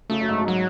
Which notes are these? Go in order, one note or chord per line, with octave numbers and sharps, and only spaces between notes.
C#3 A3
F#2
G#2
F#2
G#2
F#3